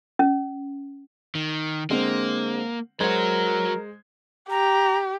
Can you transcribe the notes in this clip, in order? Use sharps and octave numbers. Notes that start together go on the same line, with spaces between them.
C#4
D#3
D3 G#3 A#3 C4
F#3 G#3 F#4 A#4 C5 G#6
G4 A#5